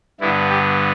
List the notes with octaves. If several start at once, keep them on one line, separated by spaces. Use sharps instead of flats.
G2 D3 B3 E4
G4